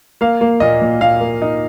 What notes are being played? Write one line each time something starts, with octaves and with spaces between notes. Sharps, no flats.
A#3 F5
A#3
A#2 D#5
A#2
A#2 F5
A#3
D#4